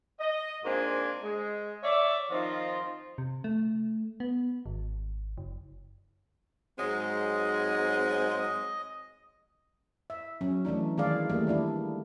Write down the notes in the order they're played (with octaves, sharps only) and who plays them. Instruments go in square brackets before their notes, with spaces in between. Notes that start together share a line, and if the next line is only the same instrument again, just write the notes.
[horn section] D#5
G#2 A#3 C4 D4 F4 G#5
G#3
C#5 D5 E5
D#3 F3 C4 D#4 F4
[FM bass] C3
A3
B3
G#1
F#1
[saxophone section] G#2 F#3 C4 [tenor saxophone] G#3 [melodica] D#5
[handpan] E5
F#3 C#4
E3 A3 D4 D#4
D#3 E3 G#3 G#4 D5 F5
E3 G3 A3 A#3
D#3 A3 D4 E4